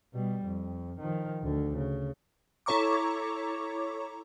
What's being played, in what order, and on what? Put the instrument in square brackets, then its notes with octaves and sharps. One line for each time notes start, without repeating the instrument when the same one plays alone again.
[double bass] B2 G3
F2
D#3 F3
D2 D3
C#3
[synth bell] E4 A4 C#5 A#5 C#6 D6